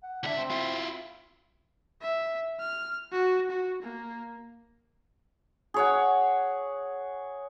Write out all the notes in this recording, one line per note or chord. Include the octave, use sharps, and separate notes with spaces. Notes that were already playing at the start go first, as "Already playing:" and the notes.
F#5
C#2 D4 E5
C4
E4 F4
E5
F6
F#4
F#4
A#3
G#4 C#5 F#5